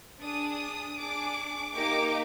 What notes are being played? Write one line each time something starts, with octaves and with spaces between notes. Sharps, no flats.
D4 G#4 D#6
D4 G#4 D6
A#3 D#4 G4 D6